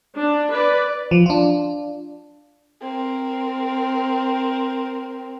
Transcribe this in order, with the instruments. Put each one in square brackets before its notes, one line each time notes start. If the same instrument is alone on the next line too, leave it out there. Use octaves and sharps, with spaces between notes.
[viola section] D4
B4 D5
[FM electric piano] F3
D4 F4
[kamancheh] C4 A#4